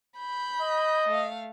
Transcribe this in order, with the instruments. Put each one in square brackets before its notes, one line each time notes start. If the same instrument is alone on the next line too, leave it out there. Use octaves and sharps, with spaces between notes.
[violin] B5 G6
[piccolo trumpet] D#5
[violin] A3 F5